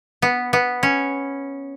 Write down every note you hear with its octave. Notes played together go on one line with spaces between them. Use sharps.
B3
B3
C#4